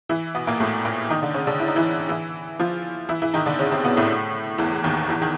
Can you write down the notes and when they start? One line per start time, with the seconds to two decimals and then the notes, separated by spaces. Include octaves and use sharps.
0.09 E3 E4
0.35 B2 B3
0.47 A#2 A#3
0.60 A2 A3
0.85 A#2 A#3
1.10 D#3 D#4
1.22 D3 D4
1.34 C#3 C#4
1.47 D3 D4
1.60 E4
1.68 D#4
1.76 E3 E4
2.09 E3 E4
2.60 F3 F4
3.09 E3 E4
3.22 E3 E4
3.34 D#3 D#4
3.46 D3 D4
3.59 C#3 C#4
3.71 C3 C4
3.84 B2 B3
3.97 A2 A3
4.58 E2 E3
4.84 D#2 D#3
5.09 E2 E3
5.22 D#3